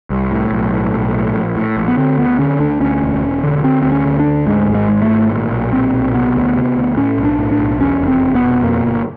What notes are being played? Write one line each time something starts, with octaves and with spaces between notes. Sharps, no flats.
C2
A2
B1
A2
B1
A2
A#1
A2
A#1
B3
D3 C4
D2 B3
D3 C#4
D2 D4
D2 C#4
E1
E1
D3
D3 C4
D2 C4
C#4
D3
D4
D2
G#2 G#3
G#1
G#3
G#2
A3
G#1
A#2
B1
A#2 C4
B1
C3 B3
D2
C3
D2
A2 C#4
B1
D4
A2
D4
B1
E2 C#4
F1
C4
F1
B3
B2
F2 A#3
G1